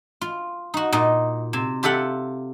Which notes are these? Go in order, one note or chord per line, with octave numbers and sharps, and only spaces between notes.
F4
D#4 F#4
A#2 D#4 D#5
C3
F4 G4 A4 E5 F#5